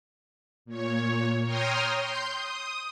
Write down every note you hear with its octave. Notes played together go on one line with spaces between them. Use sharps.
A#2 C#5
C#5 G5 A#5 C6 D#6 F6
C6 G6
D#6